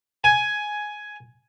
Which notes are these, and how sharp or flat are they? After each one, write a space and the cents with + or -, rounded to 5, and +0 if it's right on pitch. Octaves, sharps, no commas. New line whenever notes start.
G#5 +10